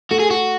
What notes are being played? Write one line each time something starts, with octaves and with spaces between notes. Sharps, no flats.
A3 F#4
G#4
F#4